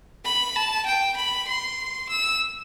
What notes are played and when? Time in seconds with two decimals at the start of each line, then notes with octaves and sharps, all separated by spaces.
0.25 B5
0.56 A5
0.86 G5
1.17 B5
1.48 C6
2.09 E6